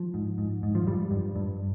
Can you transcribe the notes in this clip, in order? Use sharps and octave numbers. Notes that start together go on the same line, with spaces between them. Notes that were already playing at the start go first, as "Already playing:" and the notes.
Already playing: F3
G#2
G#2
G#2
F3
G2 G3
G2
G2